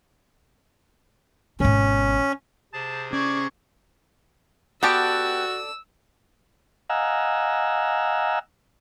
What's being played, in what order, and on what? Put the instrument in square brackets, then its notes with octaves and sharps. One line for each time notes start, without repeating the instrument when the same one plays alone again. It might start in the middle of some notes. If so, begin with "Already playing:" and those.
[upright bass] G#1 B2 [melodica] C#4
[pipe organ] C3 G#4 C5 [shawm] A5
[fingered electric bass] C#4 [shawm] D5 [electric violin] C#6 G#6
[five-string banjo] B3 G4 A5 [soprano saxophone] F#4 [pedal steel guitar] A4 D5 D6 [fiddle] E6
[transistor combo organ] D#5 F5 F#5 G#5 A#5 E6